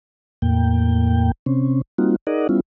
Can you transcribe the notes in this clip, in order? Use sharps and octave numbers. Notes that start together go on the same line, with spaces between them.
E2 A2 A#3 G5
C3 C4 C#4
G3 A#3 C4 D#4 F4 F#4
D#4 G#4 A#4 D5 D#5 F#5
G3 B3 C#4 E4 F4